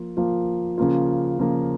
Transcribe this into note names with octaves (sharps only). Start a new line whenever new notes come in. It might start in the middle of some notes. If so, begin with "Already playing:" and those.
Already playing: F3 A#3 F4
F3 A#3 F4
C#3 F3 A#3 F4
C#3 F3 A#3 F4